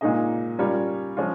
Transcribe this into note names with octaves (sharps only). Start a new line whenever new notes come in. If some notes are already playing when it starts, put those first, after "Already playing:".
A#2 G#3 D#4 G#4 D#5
G3 C#4 F4 A#4 C#5
F3 G#3 C#4 F4